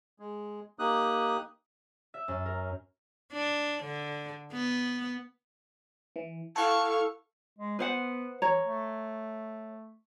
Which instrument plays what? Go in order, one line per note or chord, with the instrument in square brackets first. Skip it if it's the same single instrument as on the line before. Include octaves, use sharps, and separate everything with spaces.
[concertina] G#3
A#3 D#4 G4 D#6 F#6
[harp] E5
F#2
A#4
[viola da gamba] D4
D3
B3
[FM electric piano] E3
[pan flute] E4 [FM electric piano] A4 F#5 E6 [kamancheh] F5 C#6
[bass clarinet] G#3
[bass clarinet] B3 [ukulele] B4 C5 F#5
[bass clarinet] E3 [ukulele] C#5 A#5
[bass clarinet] A3